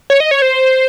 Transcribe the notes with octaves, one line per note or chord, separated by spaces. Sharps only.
C#5
D#5
C#5
C5